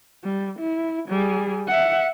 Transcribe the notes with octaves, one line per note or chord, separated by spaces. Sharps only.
G3
E4
G3 G#4
E5 F#5